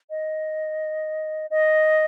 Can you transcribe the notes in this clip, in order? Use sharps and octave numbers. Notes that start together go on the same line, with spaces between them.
D#5
D#5